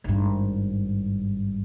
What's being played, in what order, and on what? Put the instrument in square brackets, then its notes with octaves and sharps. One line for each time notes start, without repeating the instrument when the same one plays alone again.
[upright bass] G#1 G2